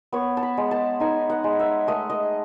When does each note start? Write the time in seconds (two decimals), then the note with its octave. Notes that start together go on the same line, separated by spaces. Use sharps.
0.12 B3 C#5
0.37 A5
0.43 B5
0.57 G#3
0.71 A5
1.00 D#4 G#5
1.30 F#5
1.44 G#3
1.59 E5
1.87 A3 D#5
2.10 D#5